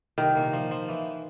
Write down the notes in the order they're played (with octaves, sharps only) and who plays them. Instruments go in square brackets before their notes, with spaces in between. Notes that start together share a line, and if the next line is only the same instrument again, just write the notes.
[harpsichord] C2 [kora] D#3
[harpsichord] A#2
F3
F3
E3